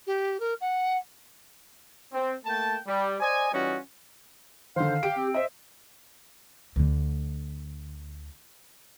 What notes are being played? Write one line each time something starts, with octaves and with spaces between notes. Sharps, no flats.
G4
A#4
F#5
C4
A3 A#3 G5 A5
G3
C5 D5 D#5 G#5
E3 G3 C#4 D#4 F4 F#4
D3 D#3 C5 F5
G4 D7
C4
C5 D#5 E5
D2 D3